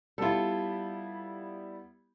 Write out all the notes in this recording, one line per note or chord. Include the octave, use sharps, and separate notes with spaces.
G3 B3 E4 F4 A4